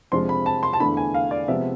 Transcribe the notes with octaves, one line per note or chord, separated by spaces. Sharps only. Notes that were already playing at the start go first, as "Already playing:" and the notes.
F2 C3 F3 G#3 D4 C6
B5
A5
C6
A5
E2 D3 A3 D4 B5
G#5
F5
D5
C3 F3 G#3 B3 E5